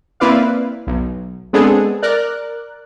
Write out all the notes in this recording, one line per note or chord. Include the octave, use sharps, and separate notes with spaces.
A#3 C4 E4 B4 D5 F5
B1
G#3 B3 C4 D4 G#4 A4
A#4 D5 F#6